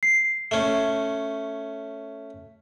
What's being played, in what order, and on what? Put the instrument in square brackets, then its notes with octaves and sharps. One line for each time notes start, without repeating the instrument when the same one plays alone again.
[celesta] C7
[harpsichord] A3 C#4